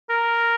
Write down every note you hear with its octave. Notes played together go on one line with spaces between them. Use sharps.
A#4